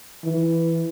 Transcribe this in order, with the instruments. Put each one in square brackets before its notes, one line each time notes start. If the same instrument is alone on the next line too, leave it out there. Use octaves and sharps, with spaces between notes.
[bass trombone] E3